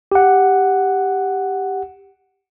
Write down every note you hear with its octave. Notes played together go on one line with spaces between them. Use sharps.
G4 F#5